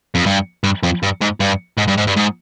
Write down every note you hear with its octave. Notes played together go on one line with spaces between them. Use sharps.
F2
G2
G2
F2
G2
G#2
G2
G#2
G2
G#2
G2
G#2